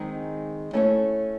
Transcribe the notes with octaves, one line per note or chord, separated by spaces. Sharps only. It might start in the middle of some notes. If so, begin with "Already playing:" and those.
Already playing: D#3 G#3 C4 D#4 G#4
A3 C#4 E4 A4 C#5